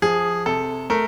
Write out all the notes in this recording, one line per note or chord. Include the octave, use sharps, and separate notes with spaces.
F3 G#4
C3 A4
A3 A#4